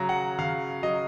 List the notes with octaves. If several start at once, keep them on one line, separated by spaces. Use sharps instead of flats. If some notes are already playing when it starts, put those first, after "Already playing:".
Already playing: C#3 F#3 A#5
F#5
C#3 F5
F#3 D#5